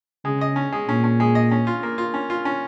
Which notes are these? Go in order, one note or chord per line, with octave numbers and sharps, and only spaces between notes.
C#3 G#3
D#5
C#4
G#3
A#2 C#4
C#4
G#3
D#5
C#4
F4
A#3
F4
C#4
F4
C#4